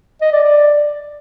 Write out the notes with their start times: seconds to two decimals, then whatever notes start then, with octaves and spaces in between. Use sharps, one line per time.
0.21 D#5
0.32 D5
0.43 D5